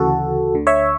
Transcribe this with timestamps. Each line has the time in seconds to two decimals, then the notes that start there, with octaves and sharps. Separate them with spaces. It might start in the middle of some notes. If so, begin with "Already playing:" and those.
Already playing: D2 C#3 E3 F#4 A4
0.54 D2 D3
0.67 C#5 E5